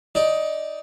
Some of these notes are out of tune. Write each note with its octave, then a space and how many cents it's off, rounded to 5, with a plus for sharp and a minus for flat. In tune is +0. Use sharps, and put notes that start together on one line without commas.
D#4 +15 D5 +0